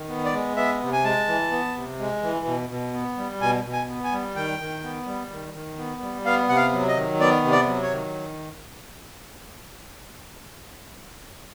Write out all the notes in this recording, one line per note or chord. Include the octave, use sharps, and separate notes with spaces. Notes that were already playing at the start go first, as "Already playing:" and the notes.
Already playing: D#3
B3
D5
G#3
B3 E5
C3
G#5
G#3 A5
E3
B3
C3
G#3
E3
B2
B2
B3
G3
B2 G#5
B2
G#5
B3
G#5
G3
D#3 G5
D#3
B3
G3
D#3
D#3
B3
G3
B3 F5
C3 F#5
F5
F#3
D#5
D#3
B3 D5
C3
D5
F#3
C#5
D#3